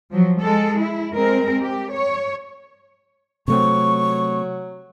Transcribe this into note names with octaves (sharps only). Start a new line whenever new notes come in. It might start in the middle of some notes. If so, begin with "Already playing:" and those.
F3 F#3
G#3 A4
E4
G#3 C4 A#4
G4
C#5
C3 F#3 A3 C4 C#6